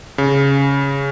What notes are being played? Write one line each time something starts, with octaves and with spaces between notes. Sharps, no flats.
C#3